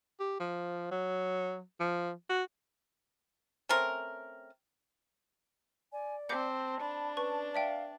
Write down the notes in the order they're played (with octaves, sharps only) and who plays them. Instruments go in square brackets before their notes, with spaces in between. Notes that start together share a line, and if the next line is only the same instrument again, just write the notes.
[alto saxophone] G4
F3
F#3
F3
F#4
[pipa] A3 C4 C#4 A#4
[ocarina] D5 [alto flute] G#5
[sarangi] C4 [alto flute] A5 [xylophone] D6 G6 C#7
[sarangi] D4 [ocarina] B5
[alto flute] C#4 [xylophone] B4 C#6 [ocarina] A5
[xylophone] D5 E5 G5 [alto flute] F5